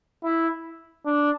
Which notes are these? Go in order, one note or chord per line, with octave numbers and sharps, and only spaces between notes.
E4
D4